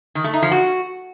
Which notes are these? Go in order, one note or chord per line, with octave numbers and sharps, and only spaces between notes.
D#3
A3
D#4
F3
F#4